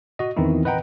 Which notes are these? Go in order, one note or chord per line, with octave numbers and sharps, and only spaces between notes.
F#4 D#5
E2 D#3 E3 C4 D#4 E4
B4 D#5 F#5 G5 A#5